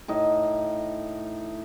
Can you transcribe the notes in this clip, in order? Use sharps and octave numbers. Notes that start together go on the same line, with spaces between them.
A2 D#4